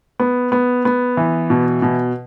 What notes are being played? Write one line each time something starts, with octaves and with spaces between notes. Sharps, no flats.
B3
B3
B3
E3
B2
B2